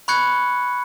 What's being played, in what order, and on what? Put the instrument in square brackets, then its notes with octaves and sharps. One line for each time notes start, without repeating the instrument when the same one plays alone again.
[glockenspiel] B5 C#6 F#6 G#6 C#7